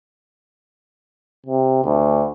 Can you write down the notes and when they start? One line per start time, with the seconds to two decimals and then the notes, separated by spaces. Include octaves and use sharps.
1.46 C3
1.84 D2